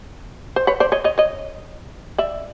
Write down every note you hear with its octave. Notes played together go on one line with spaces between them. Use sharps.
C5
B4 C#5
C5 D5
C#5 D#5
C#5 D#5
C#5 D#5
D5 E5